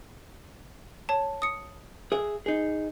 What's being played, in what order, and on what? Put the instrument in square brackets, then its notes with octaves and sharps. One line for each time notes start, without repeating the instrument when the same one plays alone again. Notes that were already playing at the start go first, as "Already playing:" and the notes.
[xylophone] C#5 A5
D#6 C#7
[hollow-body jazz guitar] G#4 E5
D#4 G#4